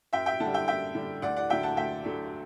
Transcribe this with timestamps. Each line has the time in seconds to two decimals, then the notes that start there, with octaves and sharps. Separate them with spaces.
0.13 F#2 E5 G5
0.26 E5 G5
0.40 D3 F#5 A5
0.46 G3
0.54 E5 G5
0.68 F#2 E5 G5
0.95 D3 G3
1.22 D2 D5 F#5
1.36 D5 F#5
1.50 D3 F#3 A3 E5 G5
1.63 F#5 A5
1.77 D2 E5 G5
2.04 D3 F#3 A3